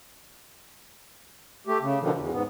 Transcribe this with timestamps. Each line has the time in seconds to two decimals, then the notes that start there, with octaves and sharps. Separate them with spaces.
1.67 A3 G4
1.81 C#3
2.01 B2 D3 D#3 F3
2.16 E2
2.31 G#2 B3